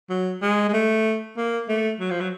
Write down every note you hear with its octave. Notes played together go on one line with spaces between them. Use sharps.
F#3
G#3
G#3
A3
A#3
A3
F#3
F3
F#3